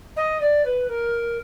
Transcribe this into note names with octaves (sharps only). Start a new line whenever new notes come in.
D#5
D5
B4
A#4